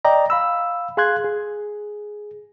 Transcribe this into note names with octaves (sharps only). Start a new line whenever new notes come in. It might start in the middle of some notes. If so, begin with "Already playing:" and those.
D5 D#5 G5 A#5
F5 B5 E6
G#4 F5 C6 F#6 G#6
G#4